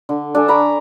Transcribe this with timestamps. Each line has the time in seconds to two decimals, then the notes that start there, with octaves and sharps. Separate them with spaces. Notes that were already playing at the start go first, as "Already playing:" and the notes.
0.09 D3
0.35 D4 A4 G#5
0.48 A#5 B5 C#6 D6